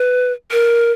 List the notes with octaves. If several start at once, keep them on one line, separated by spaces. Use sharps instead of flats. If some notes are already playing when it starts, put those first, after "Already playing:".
Already playing: B4
A#4